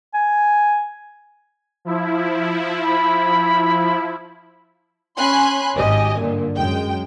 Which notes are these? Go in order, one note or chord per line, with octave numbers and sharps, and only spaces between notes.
G#5
F3 E4
B5
C#4 G#5 B5 C6 F#6
G#1 G4 D#5 G#5
G2 A#2 D3
F#2 G#3 G5